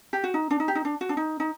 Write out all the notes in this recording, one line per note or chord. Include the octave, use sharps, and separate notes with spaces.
G4
F#4
D#4
D4
D#4
G4
D#4
D4
F#4
D4
D#4
D#4